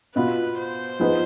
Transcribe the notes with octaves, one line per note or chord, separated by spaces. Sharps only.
B2 B3 F4 B4
C5
F3 B3 D#4 G#4 B4